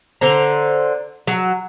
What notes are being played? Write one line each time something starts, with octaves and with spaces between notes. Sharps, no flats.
D3 C5 A#5
F#3